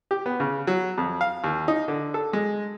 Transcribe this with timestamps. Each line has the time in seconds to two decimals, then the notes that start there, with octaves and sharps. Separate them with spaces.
0.11 G4
0.26 B3
0.40 C#3
0.67 F#3
0.98 F2
1.21 F5
1.44 D#2
1.68 D#4
1.88 D3
2.14 A4
2.33 G#3